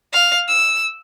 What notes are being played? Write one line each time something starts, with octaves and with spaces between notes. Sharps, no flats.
F5
E6